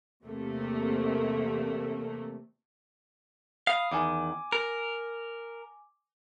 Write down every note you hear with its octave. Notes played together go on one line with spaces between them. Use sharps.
E2 C3 A3 A#3
F5 B5 D#6
E2 D#3 G#5 D6
A#4